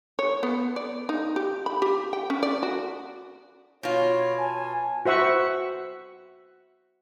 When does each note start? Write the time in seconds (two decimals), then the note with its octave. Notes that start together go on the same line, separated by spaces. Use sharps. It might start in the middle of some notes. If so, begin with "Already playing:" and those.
0.19 C#5
0.43 B3
0.76 D5
1.09 D#4
1.36 G4
1.66 B5
1.82 G4
2.13 G5
2.30 C#4
2.43 D5
2.63 F#4
3.83 B2 F4 C#5
4.39 G#5 A5
5.05 F#4 C5 E5 F#5 C#6